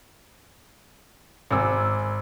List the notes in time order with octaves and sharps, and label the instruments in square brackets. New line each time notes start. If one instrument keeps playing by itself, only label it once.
[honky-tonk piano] G#1 [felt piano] G#5 D6 E6